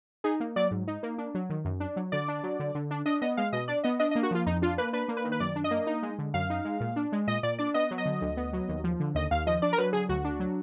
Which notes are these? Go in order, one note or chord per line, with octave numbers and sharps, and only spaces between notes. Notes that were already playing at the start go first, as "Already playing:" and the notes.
D#4 G#4
A#3
F#3 D5
G#2
D#4
A#3
D4
F#3
D#3
F#2
D4
F#3
D3 D5
D4
F#3
D3
D3
D4
D4 D#5
B3 D#5
G#3 F5
B2 D#5
D4 D5
B3 D#5
D4 D#5
D#5
A#3
F#4
F3 F4
F2 D#4
D4 F4
A#3 B4
D4 B4
A#3
B4
D#3
B4
F#2 D5
D4
D#5
A#3
D#4
G#3
D3
F#2 F5
D#4
G#3
A#2
D4
G#3
A#2 D#5
A#2 D5
D4 D5
B3 D#5
F#3
D#5
D3
D2
B3
F#3
D#2
F3
D3
D#2 D#5
D#2 F5
F3 D#5
D4 D5
A#4
F#3 B4
D3 G#4
D2 F#4
D4
F#3